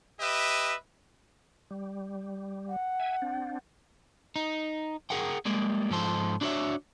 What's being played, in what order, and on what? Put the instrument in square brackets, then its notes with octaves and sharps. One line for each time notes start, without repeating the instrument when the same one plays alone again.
[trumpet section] G4 B4 D#5 E5
[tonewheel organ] G3
[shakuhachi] F#5
[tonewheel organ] E5 G#5
C4 D4
[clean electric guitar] D#4
G#4 A#4 F#5 G5
G3 G#3 A#3
G#2 F3 A4 C5
D4 E4 F#4 C5 C#5 E5